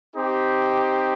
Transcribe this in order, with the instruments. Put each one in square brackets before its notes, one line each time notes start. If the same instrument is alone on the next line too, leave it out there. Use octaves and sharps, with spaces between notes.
[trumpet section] C4 D#4 G4